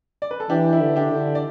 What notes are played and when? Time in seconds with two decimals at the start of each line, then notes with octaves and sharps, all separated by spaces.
0.22 D5
0.31 B4
0.40 A4
0.50 E3 D4 G4
0.73 E4
0.80 D3
0.96 D4 G4
1.12 D3
1.35 D5